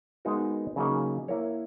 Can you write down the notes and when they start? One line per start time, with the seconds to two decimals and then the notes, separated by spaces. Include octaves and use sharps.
0.25 G#3 B3 D#4 F#4 A#4
0.76 C#3 F#3 A#3 D#4 G#4
1.28 A#3 E4 A#4 C#5